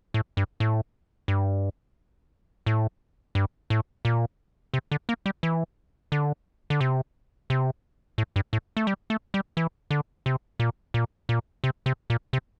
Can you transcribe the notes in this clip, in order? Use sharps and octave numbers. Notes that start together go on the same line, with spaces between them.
A2
G2
A2
G2
A2
G2
A2
A#2
C3
D3
A#3
G3
E3
D3
D3
C3
C3
A2
G2
A2
A3
G3
A3
G3
E3
D3
C3
A#2
A#2
A#2
C3
C3
A#2
C3